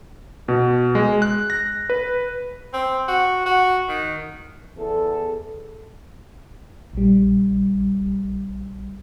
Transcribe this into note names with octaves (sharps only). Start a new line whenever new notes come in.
B2
G#3
F#6
A#6
B4
C4
F#4
F#4
D#3
E2 A4
A#1 G3